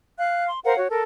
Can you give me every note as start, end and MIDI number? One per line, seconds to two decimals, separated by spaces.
0.18 0.47 77
0.18 0.47 90
0.48 0.59 84
0.64 0.76 70
0.64 0.76 72
0.64 0.76 77
0.64 0.76 78
0.76 0.87 66
0.76 0.87 73
0.90 1.02 69
0.90 1.02 70